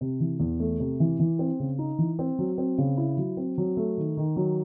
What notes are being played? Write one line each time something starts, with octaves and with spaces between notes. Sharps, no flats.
C3
E3
E2
A3
C3
E3
E3
C4
C#3
D#4
E3
C4
F#3
C4
C#3
E4
F#3
C4
F#3
A3
D#3
D#3
F#3